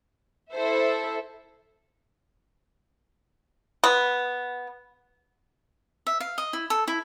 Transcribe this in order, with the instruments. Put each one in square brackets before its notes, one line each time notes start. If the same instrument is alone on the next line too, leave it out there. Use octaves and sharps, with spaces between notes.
[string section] E4 A4 C5 E5
[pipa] B3
[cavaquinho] E5
F5
D#5
E4
A4
E4